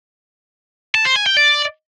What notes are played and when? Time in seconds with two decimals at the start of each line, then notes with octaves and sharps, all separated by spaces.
0.95 A5
1.05 C5
1.16 G#5
1.26 G5
1.37 D5